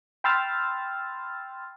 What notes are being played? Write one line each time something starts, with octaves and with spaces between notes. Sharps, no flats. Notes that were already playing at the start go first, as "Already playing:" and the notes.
G5 B5 C6 E6 F6 A6